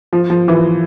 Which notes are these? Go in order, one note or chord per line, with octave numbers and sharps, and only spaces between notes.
F3
F3
E3